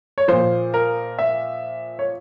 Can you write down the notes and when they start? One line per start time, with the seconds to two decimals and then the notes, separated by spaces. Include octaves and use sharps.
0.18 C#5
0.28 A#2 F3 C5
0.74 A#4
1.19 E5
1.99 C#5